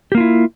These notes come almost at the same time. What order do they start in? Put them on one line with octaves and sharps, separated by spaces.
G4 A#3 F4 E4